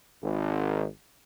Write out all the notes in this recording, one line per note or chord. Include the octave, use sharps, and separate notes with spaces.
G#1